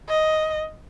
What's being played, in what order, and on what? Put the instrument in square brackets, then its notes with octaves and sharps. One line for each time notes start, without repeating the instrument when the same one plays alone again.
[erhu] D#5